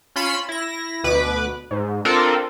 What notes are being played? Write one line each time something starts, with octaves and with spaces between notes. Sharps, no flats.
C#4 F4 B5 C6 C#7 E7
E4 A#6
D2 B2 B4 D6
G#2
C4 D4 F4 A4 A#4